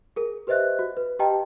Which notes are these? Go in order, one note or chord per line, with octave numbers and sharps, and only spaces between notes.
G#4 A#4
G4 B4 C5 D#5 E5 F#6
F#4
B4
G4 B4 D#5 G5 A5 A#5